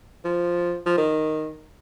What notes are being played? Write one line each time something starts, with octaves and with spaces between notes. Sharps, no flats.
F3
F3
D#3